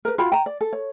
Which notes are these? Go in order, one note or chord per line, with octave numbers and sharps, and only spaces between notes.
A#4 B4
F4 F#4 G5 B5
G5 A#5
D5
A4
C#5